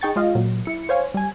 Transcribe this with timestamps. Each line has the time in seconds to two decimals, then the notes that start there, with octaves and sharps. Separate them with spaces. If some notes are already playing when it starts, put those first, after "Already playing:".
0.01 D#4 G#4 G5 C#6 A6
0.16 G#3 F4 D#5 F5
0.35 A#2 F#3
0.65 E4 C#7
0.89 C5 C#5 F5 G#5
1.14 G3 G#5